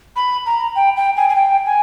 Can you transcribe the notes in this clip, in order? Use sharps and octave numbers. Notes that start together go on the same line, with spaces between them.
B5
A#5
G5
G5
G#5
G#5
G5
G#5